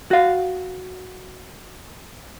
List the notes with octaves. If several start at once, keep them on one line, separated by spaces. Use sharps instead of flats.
F#4 F5